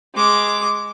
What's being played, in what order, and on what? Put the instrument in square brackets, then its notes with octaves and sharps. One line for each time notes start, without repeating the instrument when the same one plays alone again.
[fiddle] G#3 D6